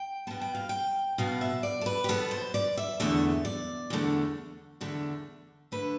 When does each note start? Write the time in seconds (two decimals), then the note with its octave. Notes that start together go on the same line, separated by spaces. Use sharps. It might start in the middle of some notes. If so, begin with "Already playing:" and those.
Already playing: G5
0.27 B2 B3 A5
0.41 G5
0.55 F5
0.69 G5
1.18 B2 B3 F5
1.41 E5
1.63 D5
1.81 A4
1.86 B4
2.04 G4
2.09 B2 B3 A4
2.31 C5
2.54 D5
2.77 E5
3.00 E2 D3 A3 E5
3.45 D5
3.90 E2 D3 A3
4.81 E2 D3 A3
5.72 D3 A3 B4